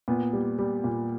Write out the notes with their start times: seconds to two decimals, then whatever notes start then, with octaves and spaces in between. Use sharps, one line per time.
0.08 A#2 B3
0.33 G3
0.59 G3
0.84 A#2